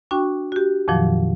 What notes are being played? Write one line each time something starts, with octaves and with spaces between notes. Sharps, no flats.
D4 F#4 G5 C#6
F#4 G4
F2 A#2 D#3 F3 F#3